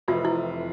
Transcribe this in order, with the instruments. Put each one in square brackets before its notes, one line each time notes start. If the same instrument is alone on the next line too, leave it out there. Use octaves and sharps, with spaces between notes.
[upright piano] F1 F2 C3 E3 [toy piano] F4
[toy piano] E4